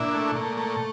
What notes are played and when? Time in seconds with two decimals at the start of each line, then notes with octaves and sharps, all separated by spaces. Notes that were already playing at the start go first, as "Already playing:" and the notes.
Already playing: A#2 D4 E4
0.14 A3
0.35 A#2
0.57 A3